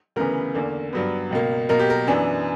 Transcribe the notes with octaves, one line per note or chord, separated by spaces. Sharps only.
D2 C#3 E3 B3 A#4
E2 D3 A#3
G2 F#3 B3
C#2 B2 A#3
B2 A#3 A#4
G4
A#4
F#2 E3 B3 D4